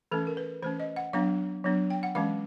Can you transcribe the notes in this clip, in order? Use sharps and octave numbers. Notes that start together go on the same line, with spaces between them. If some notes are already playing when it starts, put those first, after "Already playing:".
E3 A3 C#4 A4
A#4
B4
E3 A3 C#4 C5
D#5
F#5
F#3 B3 D4 F5
F#3 B3 D4
G5
F#5
E3 G#3 C#4 F5